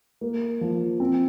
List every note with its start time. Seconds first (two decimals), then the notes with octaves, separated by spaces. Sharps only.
0.21 A#3
0.61 F3
1.00 C4